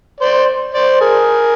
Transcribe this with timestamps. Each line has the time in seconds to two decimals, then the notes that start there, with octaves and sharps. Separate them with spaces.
0.20 C5 D5
0.74 C5 D5
1.01 G#4 A#4